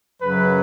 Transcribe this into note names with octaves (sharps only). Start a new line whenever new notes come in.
F#2 C#3 F#3 B4